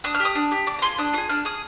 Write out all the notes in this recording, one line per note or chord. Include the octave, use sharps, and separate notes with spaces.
D4 D#6
F6
G4
D#6
D4
G4
D4 D6
A#5
F4 G#4 C6
D4 D#6
F4 G#4 D#6
D4 F6
G#4 D#6